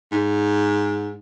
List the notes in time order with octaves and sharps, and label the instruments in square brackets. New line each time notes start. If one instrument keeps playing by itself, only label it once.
[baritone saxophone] G#2